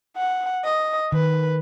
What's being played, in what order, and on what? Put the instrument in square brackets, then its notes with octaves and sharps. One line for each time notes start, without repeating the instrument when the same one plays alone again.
[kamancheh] F#5
D#5
[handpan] D#3 [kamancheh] B4